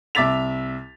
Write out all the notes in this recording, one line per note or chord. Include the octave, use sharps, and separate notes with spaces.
C2 E5 D6 A6 B6 F7